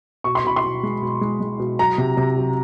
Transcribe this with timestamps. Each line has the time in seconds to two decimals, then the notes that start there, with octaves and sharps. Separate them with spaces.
0.24 B2 C#6
0.35 C6
0.44 B2 B5
0.56 C6
0.63 B2
0.83 G#3
1.02 B2
1.21 G#3
1.40 G#3
1.59 B2
1.79 F#3 A#5
1.98 C3
2.17 C3
2.37 F#3